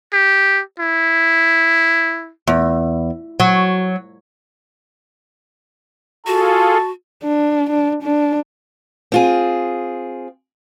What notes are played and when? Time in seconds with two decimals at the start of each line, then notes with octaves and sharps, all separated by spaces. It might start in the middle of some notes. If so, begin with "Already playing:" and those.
0.13 G4
0.79 E4
2.47 E2
3.40 F#3
6.27 F4 F#4 G#4 A4 A5
7.24 D4
7.70 D4
8.04 D4
9.12 C4 F4 G#4